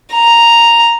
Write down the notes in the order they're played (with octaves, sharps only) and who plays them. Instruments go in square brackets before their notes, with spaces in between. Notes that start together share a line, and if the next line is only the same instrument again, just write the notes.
[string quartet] A#5